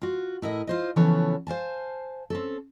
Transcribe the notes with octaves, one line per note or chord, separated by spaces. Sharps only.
F4 F#4
A2 E4 A#4 D#5
F4 C5 D#5
C#3 E3 F3 B3 A4 C#5
C5 F5 G#5 A5
C4 C#4 A4